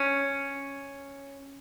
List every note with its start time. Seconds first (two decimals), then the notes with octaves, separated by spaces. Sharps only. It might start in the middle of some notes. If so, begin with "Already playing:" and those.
Already playing: C#4